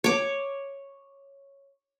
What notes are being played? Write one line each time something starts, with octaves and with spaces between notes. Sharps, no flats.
C#5 D6